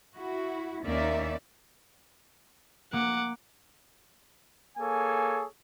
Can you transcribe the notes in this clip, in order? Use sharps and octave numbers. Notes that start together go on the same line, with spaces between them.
E4 F#4
D#2 A#3 C#4 D#4 D5 E5
A#3 F#5 D6
A#3 G#4 A4 C#5 G#5